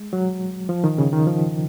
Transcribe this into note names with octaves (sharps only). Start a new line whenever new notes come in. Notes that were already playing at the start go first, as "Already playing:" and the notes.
Already playing: G#3
F#3
F3
D#3
C#3
D#3
F3